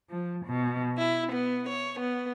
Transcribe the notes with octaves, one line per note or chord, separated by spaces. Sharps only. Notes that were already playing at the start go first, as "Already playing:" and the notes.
F3
B2
E4
B3
C#5
B3